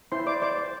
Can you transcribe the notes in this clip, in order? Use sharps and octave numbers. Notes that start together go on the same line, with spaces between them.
E4 C5 C6
C5 D5 D6
C5 D5 D6
C5